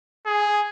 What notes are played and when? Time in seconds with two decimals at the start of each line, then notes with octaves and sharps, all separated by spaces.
0.26 G#4